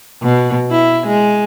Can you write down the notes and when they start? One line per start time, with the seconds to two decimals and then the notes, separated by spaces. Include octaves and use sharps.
0.22 B2
0.71 E4
1.07 G#3